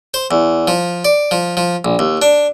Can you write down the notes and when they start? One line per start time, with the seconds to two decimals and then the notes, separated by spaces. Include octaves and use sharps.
0.14 C5
0.31 E2
0.68 F3
1.05 D5
1.31 F3
1.57 F3
1.85 A#1
1.99 D#2
2.22 D4